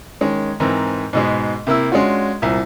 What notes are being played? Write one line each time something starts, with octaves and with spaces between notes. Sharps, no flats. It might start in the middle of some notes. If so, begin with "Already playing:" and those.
D#3 G#3 C#4
G#2 E3 C4 A#4
G#2 B2 G#3
C3 A#3 E4 E6
G#3 C#4 D4 F4 F#4
C2 A#2